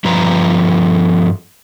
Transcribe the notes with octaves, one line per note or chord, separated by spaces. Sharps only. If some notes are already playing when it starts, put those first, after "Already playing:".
G2 F3 B4 A#5